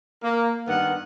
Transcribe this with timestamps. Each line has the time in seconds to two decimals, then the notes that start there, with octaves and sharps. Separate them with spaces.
0.23 A#3
0.67 G2 D#3 B3 A#4 F#5